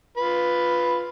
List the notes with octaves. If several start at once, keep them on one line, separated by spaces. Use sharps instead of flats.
F4 B4